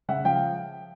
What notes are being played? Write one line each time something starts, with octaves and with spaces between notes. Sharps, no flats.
C#3 E5 F#5
F3 F5 G5